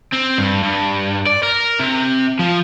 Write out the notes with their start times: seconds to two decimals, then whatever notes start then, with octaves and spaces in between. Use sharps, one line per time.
0.12 C4
0.38 G2
0.63 G2
1.27 D5
1.43 A#4
1.80 C3
2.39 F3